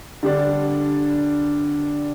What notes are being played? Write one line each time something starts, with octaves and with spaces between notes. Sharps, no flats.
D3 G3 D4